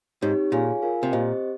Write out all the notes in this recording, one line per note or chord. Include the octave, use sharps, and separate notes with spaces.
G#2 C4 D#4 G4 C#5
A#2 F4 G#4 C#5 F5 G#5
F4 A#4 F5 G#5
C3
A#2 C4 G4 C5 D#5